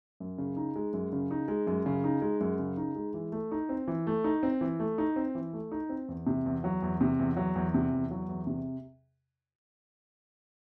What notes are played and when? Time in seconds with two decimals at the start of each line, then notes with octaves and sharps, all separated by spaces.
0.20 F#2
0.38 C#3
0.57 D#4
0.76 G#3
0.93 F#2
1.13 C#3
1.31 D#4
1.48 G#3
1.67 F#2
1.86 C#3
2.04 D#4
2.22 G#3
2.41 F#2
2.59 C#3
2.77 D#4
2.96 G#3
3.14 E3
3.32 A3
3.51 D#4
3.69 C4
3.88 E3
4.07 A3
4.24 D#4
4.43 C4
4.61 E3
4.79 A3
4.98 D#4
5.16 C4
5.35 E3
5.53 A3
5.72 D#4
5.89 C4
6.09 E2
6.27 C3
6.46 E2
6.64 F#3
6.82 E2
7.01 C3
7.19 E2
7.36 F#3
7.55 E2
7.74 C3
7.93 E2
8.11 F#3
8.28 E2
8.47 C3